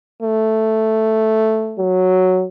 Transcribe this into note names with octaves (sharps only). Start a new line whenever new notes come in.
A3
F#3